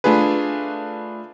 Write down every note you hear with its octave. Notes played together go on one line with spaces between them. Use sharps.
A3 D4 F4 G#4 B4